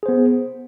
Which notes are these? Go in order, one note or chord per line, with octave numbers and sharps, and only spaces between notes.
B3 G#4 C5